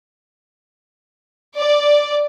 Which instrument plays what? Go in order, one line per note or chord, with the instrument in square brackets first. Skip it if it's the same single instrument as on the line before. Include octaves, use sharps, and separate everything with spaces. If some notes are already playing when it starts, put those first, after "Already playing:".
[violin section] D5